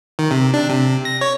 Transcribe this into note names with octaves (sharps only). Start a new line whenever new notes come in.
D#3
C3
D4
C3
A#6
C#5